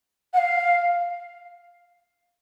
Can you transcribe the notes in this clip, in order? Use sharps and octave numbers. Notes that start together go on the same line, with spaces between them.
F#5
F5